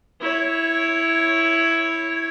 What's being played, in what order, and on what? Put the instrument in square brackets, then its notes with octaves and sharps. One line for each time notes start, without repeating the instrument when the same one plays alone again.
[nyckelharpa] E4 C#5